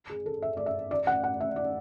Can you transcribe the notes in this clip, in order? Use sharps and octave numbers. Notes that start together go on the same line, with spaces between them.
G#4
A4
E5
D5
E5
D5
F#5
F#5
E5
D5